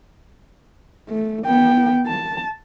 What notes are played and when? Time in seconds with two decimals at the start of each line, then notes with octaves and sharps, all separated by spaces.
1.09 A3
1.45 B3 G5
2.06 A5